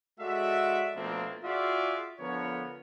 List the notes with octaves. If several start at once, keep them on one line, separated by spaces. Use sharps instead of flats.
G#3 F#4 A4 D5 E5
B2 F3 A3 A#3 C4 D4
F4 F#4 G#4 D5 E5 F5
D3 F3 B3 A#4 C#5